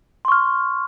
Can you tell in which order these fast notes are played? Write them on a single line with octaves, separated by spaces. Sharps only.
C6 C#6 F6